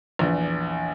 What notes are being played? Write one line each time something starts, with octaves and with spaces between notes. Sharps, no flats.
A#1 E2